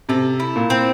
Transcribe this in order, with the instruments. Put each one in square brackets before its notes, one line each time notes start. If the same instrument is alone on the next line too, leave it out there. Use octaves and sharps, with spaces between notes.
[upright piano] C3 [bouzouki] A4
[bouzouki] E4
[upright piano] A#2
[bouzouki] C4